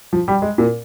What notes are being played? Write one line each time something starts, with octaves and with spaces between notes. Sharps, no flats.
F3
G3
G#3
A#2